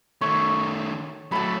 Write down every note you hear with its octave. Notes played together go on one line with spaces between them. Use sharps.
D#3 A3 C#5
F#3 A3 A5 B5